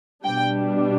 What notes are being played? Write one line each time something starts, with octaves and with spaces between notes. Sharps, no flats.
B2 G3 D4 G5